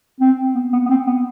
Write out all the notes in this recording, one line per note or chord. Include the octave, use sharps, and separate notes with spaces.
C4
B3
B3
B3
C4
B3